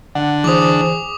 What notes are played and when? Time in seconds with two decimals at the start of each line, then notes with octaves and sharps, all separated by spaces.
0.15 D3 F#5
0.44 E3 G#4 C5 D6 D#6